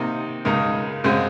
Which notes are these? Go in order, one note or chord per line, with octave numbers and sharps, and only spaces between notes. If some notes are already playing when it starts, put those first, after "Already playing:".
Already playing: C3 D#3 A#3 D#4
C#2 C#3 G#3 D#4 A#4
F#2 C#3 G#3 C4